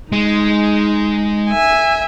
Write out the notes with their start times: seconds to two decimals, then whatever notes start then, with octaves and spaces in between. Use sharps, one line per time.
0.12 G#3 D#4
1.49 E5 G#5